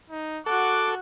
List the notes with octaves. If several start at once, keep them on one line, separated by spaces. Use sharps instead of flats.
D#4
F#4 A4 F#5 D6